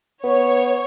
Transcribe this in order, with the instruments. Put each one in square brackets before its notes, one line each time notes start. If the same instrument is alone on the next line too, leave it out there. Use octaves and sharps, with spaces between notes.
[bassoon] B3 [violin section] C#5